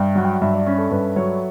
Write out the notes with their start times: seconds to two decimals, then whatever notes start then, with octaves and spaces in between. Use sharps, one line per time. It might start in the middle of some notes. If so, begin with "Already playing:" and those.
Already playing: G2 E5 G5
0.15 F#3 F#5
0.25 G5
0.33 F#5
0.41 G2 E5
0.54 D5
0.67 C#4
0.78 A4
0.91 G2 B4
1.16 F#3 C#5